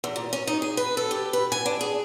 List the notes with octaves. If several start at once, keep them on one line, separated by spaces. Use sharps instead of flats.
E2
A#2
C#4
D#4
G#4
B4
A4
G4
B4
G#5
D4
G#4